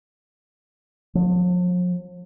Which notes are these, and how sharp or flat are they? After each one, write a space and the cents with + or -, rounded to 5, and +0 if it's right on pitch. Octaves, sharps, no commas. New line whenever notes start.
F3 +45